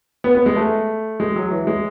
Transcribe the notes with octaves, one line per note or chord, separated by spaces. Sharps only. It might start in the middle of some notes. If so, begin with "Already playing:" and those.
B3
B3
G#3
A3
G#3
F#3
E3
G#3